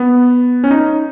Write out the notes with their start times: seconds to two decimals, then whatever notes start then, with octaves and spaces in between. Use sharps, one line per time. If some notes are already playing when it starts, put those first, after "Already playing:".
Already playing: B3
0.64 C#4
0.70 D#4